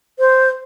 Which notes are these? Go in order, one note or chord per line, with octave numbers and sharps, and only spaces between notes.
C5